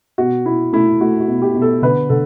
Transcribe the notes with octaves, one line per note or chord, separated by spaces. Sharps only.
B2 F#4
B2 E4
A3 E4
A3 F#4
F#4
B2
G4
B2
A4
D3 B4
D3 A4